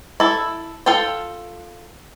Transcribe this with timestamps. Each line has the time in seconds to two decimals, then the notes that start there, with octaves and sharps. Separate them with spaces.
0.20 E4 A4
0.86 F4 A4 F5 G5